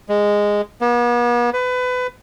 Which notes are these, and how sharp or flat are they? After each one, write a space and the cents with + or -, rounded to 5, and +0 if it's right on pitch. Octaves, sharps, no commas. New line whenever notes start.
G#3 -10
B3 -45
B4 +25